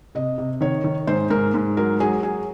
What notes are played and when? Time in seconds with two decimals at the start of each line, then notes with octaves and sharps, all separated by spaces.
0.15 C3 D#5
0.38 C3
0.61 D#3 C#5
0.84 D#3
1.07 G#2 C5
1.30 G#2 A#4
1.54 G#2
1.77 F#3 A#4
2.00 F#3 G#4
2.23 F#3 G#4